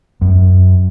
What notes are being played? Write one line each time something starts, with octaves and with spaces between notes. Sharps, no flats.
F#2